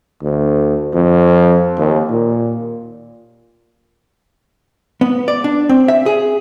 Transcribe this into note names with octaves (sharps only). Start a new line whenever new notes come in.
D2
F2
D#2
A#2
B3
D5
D4
C4
E5
G#4